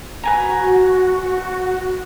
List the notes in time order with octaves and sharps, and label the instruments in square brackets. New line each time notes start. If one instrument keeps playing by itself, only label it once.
[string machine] F#4 [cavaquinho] B4 G#5 A#5